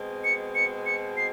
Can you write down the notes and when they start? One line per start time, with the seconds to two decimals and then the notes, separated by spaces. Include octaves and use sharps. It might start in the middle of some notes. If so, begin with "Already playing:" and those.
Already playing: B2 G#3 C4
0.24 C#7
0.55 C#7
0.86 C#7
1.17 C7